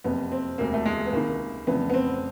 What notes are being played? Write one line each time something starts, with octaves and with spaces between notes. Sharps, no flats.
F#1 F2 C3 B3
C4
E1 D2 C3 A#3
A3
G#3
B3
C#2 C3 D#3 A#3
F1 F2 C#3 E3 B3
B3
C4